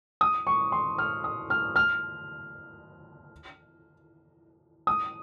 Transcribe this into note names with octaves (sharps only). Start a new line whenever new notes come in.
D#6
C#6
C6
F6
D#6
F6
F6
D#6